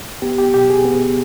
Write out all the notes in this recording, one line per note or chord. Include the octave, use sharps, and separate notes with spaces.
B3 G4
G4
B2 G4
G#4
B3